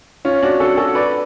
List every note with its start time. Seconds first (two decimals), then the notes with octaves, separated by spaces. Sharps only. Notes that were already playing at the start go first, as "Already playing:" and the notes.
0.25 C#4 F4
0.43 D4 F#4
0.60 F#4 A4
0.77 F#4 A4
0.95 B4 D5